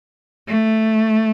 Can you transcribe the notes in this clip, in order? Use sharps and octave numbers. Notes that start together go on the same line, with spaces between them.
A3